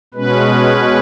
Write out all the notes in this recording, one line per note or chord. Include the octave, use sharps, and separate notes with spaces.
B2 G#3 C#4 B4